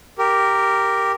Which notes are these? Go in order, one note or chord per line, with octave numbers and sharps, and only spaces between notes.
G4 A#4